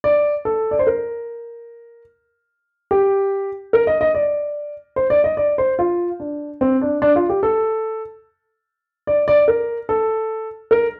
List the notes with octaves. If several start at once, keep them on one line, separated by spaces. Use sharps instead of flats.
D5
A4
D5
C5
A#4
G4
A#4
D#5
D#5
D5
C5
D5
D#5
D5
C5
F4
D4
C4
D4
D4
F4
G4
A4
D5
D5
A#4
A4
A#4